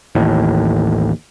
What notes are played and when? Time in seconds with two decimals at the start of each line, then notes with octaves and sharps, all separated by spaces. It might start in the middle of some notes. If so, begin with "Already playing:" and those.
0.15 A1 D#2 A2